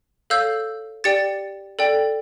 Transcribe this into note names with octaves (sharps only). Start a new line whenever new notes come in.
A4 C#5 F5 E6 G6
G4 D5 G5 A6 C#7
A4 D5 G5